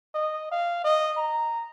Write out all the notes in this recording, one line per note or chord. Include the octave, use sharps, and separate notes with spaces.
D#5
F5
D#5
A#5